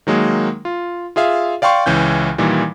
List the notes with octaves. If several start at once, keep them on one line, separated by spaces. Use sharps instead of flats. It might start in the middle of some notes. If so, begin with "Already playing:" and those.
D#3 F#3 G#3 A#3
F4
F4 G#4 E5 F5
D5 F5 G5 C6 C#6
C#2 E3 C#4 G6
A#2 D#3 E3 G3